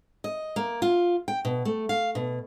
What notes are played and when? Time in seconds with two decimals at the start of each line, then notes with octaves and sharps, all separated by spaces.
0.24 D#5
0.56 A#3
0.82 F4
1.28 G5
1.45 B2
1.65 A3
1.89 F5
2.15 B2